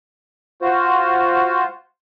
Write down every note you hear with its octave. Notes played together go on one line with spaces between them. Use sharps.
F4 F#4 C5